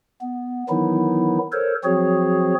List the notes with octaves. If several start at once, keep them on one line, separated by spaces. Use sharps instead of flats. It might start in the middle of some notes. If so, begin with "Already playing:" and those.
B3
D#3 E3 F#3 B3 D#4 E4
A4 A#4 C5 C#5
F3 F#3 C4 F#4 G#4 C#5